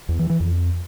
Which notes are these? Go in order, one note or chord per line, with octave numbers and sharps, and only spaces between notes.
E2
E3
E3
F2